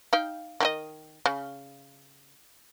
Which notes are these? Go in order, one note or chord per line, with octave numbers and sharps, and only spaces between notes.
D#4 F5 G5
D#3 G4 D#5
C#3